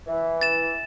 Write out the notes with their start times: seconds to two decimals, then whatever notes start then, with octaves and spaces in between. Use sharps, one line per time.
0.07 E3
0.41 A6 E7